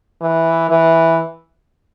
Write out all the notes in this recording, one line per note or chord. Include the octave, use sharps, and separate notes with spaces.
E3
E3